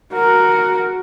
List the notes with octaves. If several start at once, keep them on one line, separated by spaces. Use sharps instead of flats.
F#4 A#4